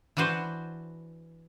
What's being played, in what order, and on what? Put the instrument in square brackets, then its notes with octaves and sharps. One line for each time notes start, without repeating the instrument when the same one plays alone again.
[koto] E3 D4 F#4 B4 C5